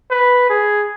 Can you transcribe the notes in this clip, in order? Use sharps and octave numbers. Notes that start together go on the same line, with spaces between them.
B4
G#4